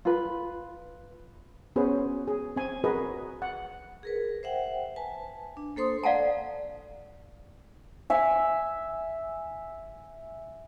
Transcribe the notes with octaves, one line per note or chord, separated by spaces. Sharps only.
F4 B4
B3 C#4 F#4 G#4 B4 C5
G#4
C4 G#5
F#4 G#4 A#4 B4 D#5
F#5
G#4 A#4 B4
C5 E5 F#5 G5
B4 G#5 A5
D4
A#3 A4 C5 C6 D#6
D5 F5 F#5 A5 A#5
E5 G#5